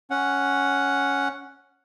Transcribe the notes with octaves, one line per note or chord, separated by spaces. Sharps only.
C#4 F#5